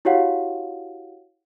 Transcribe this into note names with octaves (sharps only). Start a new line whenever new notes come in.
E4 F#4 G4 C#5 F5 F#5